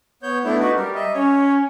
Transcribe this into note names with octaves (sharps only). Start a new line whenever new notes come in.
B3 C#5 G6
A3 B3 D4 E4
D#4 F#4 B4
G3 A#4
D#5 E5
C#4 C#5